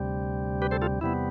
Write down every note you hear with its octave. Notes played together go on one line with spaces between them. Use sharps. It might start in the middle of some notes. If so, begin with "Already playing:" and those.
Already playing: D2 C3 G3
G4 B4
A4 C5
F4 A4
E2 C3 G3 B3 E4